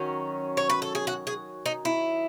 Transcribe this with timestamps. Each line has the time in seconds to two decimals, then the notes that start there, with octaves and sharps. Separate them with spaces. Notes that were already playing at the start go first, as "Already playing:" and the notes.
Already playing: D#3 F#3 C#4
0.57 C#5
0.70 B4
0.82 A4
0.95 G#4
1.07 F#4
1.27 G#4
1.66 D#4
1.85 E4